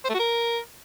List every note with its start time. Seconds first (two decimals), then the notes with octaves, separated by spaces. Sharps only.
0.04 C5
0.09 A3
0.14 F#4
0.19 A#4